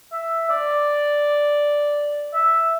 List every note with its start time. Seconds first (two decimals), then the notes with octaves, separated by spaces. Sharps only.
0.12 E5
0.50 D5
2.34 E5